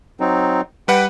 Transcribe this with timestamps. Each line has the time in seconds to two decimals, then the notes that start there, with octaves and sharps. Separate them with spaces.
0.20 F#3 C4 D#4
0.88 G3 B4 F#5 G5